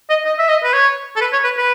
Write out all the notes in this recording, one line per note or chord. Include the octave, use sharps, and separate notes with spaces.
D#5
D#5
E5
D#5
B4
C#5
A4
B4
C#5
B4
B4